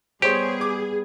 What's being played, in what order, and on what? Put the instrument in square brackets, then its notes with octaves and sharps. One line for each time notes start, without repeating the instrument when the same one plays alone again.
[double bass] G3 B3 [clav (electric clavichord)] G4 [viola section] G#4 [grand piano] C5 C#5 C6
[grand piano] D6